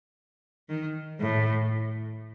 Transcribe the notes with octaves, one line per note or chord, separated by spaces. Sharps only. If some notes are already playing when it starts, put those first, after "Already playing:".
D#3
A2